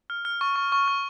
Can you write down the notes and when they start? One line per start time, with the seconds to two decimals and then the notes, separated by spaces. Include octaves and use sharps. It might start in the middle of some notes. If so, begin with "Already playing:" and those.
0.10 F6
0.25 F6
0.41 C#6
0.56 C#6
0.72 C#6
0.88 F6